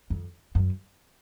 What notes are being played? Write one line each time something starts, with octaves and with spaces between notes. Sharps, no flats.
F2
F#2